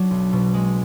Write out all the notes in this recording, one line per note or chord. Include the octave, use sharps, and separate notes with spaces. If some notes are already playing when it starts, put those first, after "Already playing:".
Already playing: F#3 D4
B1
B2
G#3